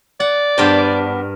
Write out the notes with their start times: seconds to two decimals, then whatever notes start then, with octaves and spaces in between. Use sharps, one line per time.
0.20 D5 F#5
0.58 G2 B3 D4 A#4 C5 G5